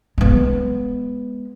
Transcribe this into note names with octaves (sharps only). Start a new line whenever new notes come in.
G#3 B3